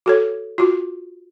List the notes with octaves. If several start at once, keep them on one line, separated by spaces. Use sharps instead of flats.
F#4 A4 C#5
F4 F#4